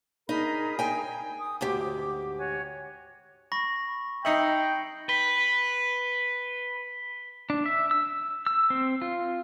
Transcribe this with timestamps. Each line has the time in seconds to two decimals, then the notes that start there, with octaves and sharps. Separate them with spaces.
0.29 D#4 G#4 A#4 B5
0.79 G5 G#5
1.38 D#6
1.61 D2 G#2 G4 D6
2.38 F#4 C#5 G#5
3.52 B5 C#6 A#6
4.25 D#4 D#5 E5 G5 C7 C#7 F#7
5.09 B4 B6 G7
7.50 D4
7.66 E5
7.91 E6
8.47 E6
8.70 C4
9.02 F4